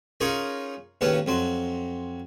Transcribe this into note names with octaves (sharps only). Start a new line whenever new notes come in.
C#4 D#4 F4 G#4 A#4 C#5
D#2 A2 C#3 C#4 B4 A5
F2 F#3 C6